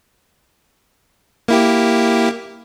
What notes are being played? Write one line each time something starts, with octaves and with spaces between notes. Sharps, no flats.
A#3 E4 G4